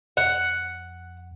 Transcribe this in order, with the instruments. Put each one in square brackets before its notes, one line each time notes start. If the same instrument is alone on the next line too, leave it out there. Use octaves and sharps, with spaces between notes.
[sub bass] F2 [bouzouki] F#5